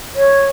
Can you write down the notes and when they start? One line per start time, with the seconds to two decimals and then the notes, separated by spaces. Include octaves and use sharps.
0.16 C#5